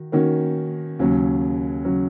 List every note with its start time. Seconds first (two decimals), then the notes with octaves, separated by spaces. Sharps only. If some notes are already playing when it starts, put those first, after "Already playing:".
Already playing: D#3 F#4
0.12 D#3 A#3 C#4 F#4
0.99 D#2 C#3 F#3
1.85 C#3 F#3